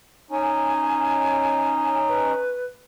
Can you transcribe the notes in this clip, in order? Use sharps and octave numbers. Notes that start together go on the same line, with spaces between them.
C#4 D#4 G#5
B4